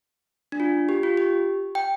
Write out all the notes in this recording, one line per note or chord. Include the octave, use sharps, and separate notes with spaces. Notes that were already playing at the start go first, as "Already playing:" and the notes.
D4
F4
G4
F4
G4
G5